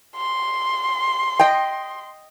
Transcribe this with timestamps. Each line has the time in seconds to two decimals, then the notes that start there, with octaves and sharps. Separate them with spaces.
0.16 C6
1.39 D#5 G5